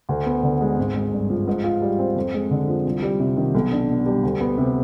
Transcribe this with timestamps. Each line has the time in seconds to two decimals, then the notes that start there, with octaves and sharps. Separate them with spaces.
0.09 D2
0.26 B3
0.43 D3
0.61 G#3
0.78 G#1
0.95 G#3
1.12 G2
1.30 F3
1.47 G#2
1.64 F4
1.82 G3
1.99 C4
2.16 F2
2.34 G#3
2.51 D3
2.68 F3
2.85 C2
3.02 G3
3.20 C3
3.37 D#3
3.54 B1
3.72 D4
3.89 B2
4.06 G3
4.23 D2
4.40 B3
4.57 C3